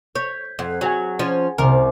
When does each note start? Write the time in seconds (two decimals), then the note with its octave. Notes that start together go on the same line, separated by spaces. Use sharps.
0.15 C#5 G6 G#6 B6
0.59 F2 F#5
0.81 F#3 G#4 F#5 G#5
1.19 F3 C#4
1.58 C2 C3 A#4